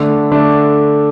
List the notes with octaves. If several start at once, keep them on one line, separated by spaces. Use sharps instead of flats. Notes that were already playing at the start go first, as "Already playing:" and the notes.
Already playing: D3 A3 D4
D3 A3 D4